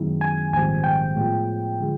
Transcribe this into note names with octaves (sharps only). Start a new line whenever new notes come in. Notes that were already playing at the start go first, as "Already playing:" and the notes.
Already playing: F#2 D#3 G#3 B3 E4
G#5
A#1 G#2 D#3 G3 C4 G#5
G5
A2 F3 G#3 B3
D3 F3 G#3